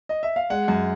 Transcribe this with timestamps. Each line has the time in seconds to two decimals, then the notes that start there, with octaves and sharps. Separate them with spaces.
0.09 D#5
0.23 E5
0.36 F5
0.50 G#3 F#5
0.68 F#2